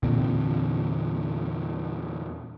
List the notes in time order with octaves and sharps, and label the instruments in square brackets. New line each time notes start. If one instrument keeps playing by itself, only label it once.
[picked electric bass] E2 A#2 D3 C4